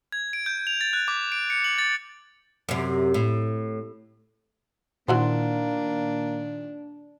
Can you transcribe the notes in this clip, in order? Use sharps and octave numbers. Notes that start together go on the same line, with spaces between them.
G#6
D7
G6
F7
A6
F#6
D6
D7
C#7
F#7
A6
F#2 C3
A2
A#2 D#3 E3 A#3 D4 F#4 C5